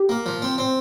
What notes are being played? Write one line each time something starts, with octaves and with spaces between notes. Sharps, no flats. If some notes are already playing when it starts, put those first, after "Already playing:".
Already playing: G4
A#3
F3
C4
C4